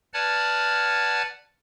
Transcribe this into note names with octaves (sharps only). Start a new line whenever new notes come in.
B4 D5 F#5 A5 F6 G#6